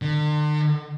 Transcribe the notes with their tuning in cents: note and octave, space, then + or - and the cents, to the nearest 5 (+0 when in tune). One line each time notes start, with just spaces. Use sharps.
D3 +40